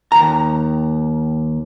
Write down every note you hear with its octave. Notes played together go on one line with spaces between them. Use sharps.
D#2 A#5